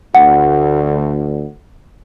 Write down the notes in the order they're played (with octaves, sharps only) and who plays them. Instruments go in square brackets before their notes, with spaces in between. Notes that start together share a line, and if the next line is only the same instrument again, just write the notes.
[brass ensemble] D2 [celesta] F#5